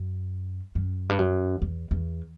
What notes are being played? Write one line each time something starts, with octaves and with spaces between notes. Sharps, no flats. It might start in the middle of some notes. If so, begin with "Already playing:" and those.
Already playing: F#2
F#2
G2
F#2
E2
E2